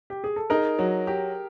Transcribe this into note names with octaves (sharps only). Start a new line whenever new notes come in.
G4
G#4
A4
D#4 G#4 A#4
F#3
G4